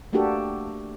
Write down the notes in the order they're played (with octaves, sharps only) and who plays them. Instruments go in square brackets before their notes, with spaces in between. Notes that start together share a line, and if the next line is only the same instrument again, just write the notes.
[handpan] A3 A#3 D4 F#4 G4 A4